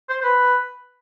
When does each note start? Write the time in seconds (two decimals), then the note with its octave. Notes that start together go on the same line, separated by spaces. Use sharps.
0.09 C5
0.20 C5
0.24 B4